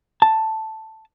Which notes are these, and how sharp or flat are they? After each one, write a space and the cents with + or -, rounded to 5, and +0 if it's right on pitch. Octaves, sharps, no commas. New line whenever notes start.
A5 +5